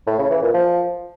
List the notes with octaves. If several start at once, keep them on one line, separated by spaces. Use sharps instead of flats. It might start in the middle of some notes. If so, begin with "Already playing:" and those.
A2
C#3
E3
A#2
F3